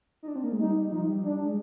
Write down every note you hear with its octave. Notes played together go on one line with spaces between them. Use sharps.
D#4
D4
C4
A#3
G#3
G3 D#4
F3 D#4
G3
D4
G#3